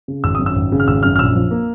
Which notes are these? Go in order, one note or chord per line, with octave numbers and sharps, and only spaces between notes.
C#3
G#1 E6
F#2 D#6
E6
G#1
C#3
F6
G#1 E6
F#2 F6
F6
A#1 E6
F3
A#3